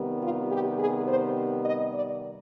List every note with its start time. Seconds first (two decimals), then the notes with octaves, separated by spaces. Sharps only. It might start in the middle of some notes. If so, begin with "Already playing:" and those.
Already playing: C3 D#3 G3 B3
0.22 F4
0.51 G4
0.79 G#4
1.07 C5
1.64 D#5
1.93 D5